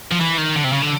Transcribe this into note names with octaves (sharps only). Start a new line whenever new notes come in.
F3
E3
D#3
D3
C3
C#3
D3